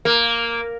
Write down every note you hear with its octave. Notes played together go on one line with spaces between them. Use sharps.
A#3